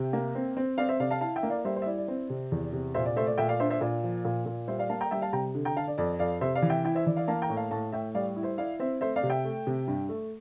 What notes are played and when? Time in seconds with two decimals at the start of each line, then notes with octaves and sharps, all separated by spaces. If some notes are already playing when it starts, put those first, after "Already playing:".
Already playing: C3 E5 G5
0.13 A#3
0.35 C4
0.57 C4
0.78 C4 D5 F5
0.89 C5 E5
1.00 C3 D5 F5
1.11 F5 A5
1.21 E4 F5 A5
1.36 E5 G5
1.43 A#3
1.50 D5 F5
1.65 G3 C5 E5
1.76 C5
1.82 E5
1.86 E4 D5
1.98 D5
2.08 C4
2.30 C3
2.52 E2
2.73 C3
2.94 A#2 C5 E5
3.06 D5
3.16 A3 C5 E5
3.27 D5
3.38 A#2 E5 G5
3.49 D5 F5
3.60 D4 C5 E5
3.70 C5 E5
3.81 A#2 D5
4.04 F3
4.25 A#2
4.46 A#2
4.67 G3 C5 E5
4.79 D5 F5
4.89 A#3 F5 A5
5.01 G5 A#5
5.11 G3 E5 G5
5.22 F5 A5
5.33 C3 G5 A#5
5.55 D3
5.65 G5 A#5
5.77 D3 F5 A5
5.88 D5
5.98 F2 D5
6.19 F2 D5 F5
6.41 C3 C5 E5
6.55 D5 F5
6.62 E3
6.70 E5 G5
6.84 E4 E5 G5
6.95 C5 E5
7.06 E3 D5
7.16 D5 F5
7.28 A#3 F5 A5
7.42 G5 A#5
7.49 A2
7.57 F5 A5
7.71 A2 F5 A5
7.92 A2 E5 G5
8.14 G3 D5 F5
8.36 E4
8.43 C5 E5
8.57 E4 D5 F5
8.80 C4 C5 E5
9.01 A3 C5 E5
9.16 D5 F5
9.23 C3
9.30 E5 G5
9.45 A3
9.67 C3
9.88 G2
10.09 A3